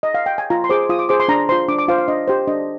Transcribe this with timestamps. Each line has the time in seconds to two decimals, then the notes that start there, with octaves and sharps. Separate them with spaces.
0.03 D#5
0.14 F5
0.26 G5
0.38 G#5
0.50 F4 A#5
0.64 C6
0.70 G#4 C5 D6
0.89 F4 D#6
0.99 D6
1.09 G#4 C5 D6
1.20 C6
1.28 D4 A#5
1.49 F4 C5 C6
1.68 D4 D6
1.79 D6
1.88 F4 C5 F5
1.98 F5
2.08 D4 D#5
2.28 G4 C5
2.47 D4 D#5